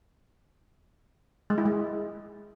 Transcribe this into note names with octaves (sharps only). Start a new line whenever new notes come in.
G#3
E4
G#3